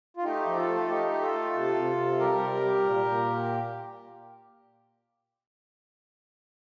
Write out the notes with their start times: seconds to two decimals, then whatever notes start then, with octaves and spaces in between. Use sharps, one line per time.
0.17 F4
0.23 A3 D#4 G4
0.46 F3
0.56 F4 A4
0.67 A3
0.88 A3 D#4 G4
1.10 A3
1.21 F4 A4
1.32 A3
1.54 C3
1.75 C3
1.97 C3
2.19 G3 G4 A#4
2.41 C3
2.62 G3
2.83 A#2
3.05 A#2